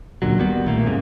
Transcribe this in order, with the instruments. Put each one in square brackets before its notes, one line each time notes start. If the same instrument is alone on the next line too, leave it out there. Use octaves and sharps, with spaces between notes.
[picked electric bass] C#2 A#2 D3 F#3
D#3 G3 B3
B1 A#2 A3 A#3
F2 G#2 C#3